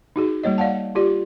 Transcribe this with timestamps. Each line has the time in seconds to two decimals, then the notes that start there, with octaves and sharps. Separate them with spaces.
0.16 D#4 F#4 G#4
0.43 G3 A#3 C#5 D#5
0.58 D5 F5 F#5 A5
0.95 F4 G4 D5